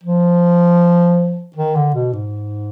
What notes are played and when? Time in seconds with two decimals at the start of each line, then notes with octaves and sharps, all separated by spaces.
0.04 F3
1.56 D#3
1.75 D3
1.94 B2
2.13 G#2